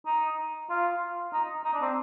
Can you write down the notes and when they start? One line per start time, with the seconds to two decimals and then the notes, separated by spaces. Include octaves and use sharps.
0.06 D#4
0.70 F4
1.33 D#4
1.64 D#4
1.73 D4
1.81 C4